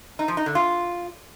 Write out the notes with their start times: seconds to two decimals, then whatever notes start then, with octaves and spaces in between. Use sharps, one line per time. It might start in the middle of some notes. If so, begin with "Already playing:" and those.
0.19 D#4
0.28 F3
0.37 D#4
0.46 D3
0.55 F4